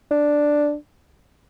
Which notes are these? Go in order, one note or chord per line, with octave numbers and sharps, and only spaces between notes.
D4